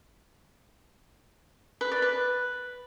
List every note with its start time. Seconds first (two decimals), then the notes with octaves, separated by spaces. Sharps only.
1.81 B4
1.92 D5
2.02 B4